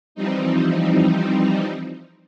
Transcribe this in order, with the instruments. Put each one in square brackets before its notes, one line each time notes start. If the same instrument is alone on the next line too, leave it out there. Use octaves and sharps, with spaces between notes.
[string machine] E3 F3 G3 C4 D#4